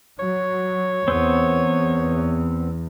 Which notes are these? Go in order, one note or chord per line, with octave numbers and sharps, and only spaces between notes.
F#3 C#5
E2 B3 C4